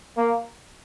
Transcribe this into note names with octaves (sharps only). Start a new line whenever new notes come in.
A#3